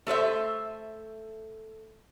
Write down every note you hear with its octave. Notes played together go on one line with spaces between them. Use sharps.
A3 A4 C5 E5